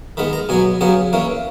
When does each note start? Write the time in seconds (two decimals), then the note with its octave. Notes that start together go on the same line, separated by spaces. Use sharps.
0.17 D#3 G#3 B3 B5
0.33 A#5
0.49 B2 F#3 B3 G#5
0.81 C#3 F#3 B3 G#5
1.13 E3 A#3 C#4